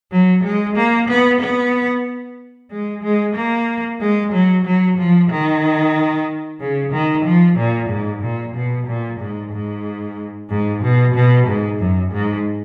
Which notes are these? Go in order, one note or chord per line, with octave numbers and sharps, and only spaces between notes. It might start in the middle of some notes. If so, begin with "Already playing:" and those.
F#3
G#3
A#3
B3
B3
G#3
G#3
A#3
G#3
F#3
F#3
F3
D#3
C#3
D#3
F3
A#2
G#2
A#2
B2
A#2
G#2
G#2
G#2
B2
B2
G#2
F#2
G#2